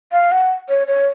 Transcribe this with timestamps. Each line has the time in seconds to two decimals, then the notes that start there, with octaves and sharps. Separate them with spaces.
0.12 F5
0.32 F#5
0.69 C#5
0.87 C#5